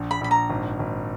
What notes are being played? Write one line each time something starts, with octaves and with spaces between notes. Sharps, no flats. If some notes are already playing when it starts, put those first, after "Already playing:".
Already playing: A#1
B5
A#1 B5
A#5
G#1
G#1